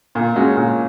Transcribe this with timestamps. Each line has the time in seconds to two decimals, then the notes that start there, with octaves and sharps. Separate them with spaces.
0.15 A#2
0.36 G#3 C#4 F#4
0.56 A#2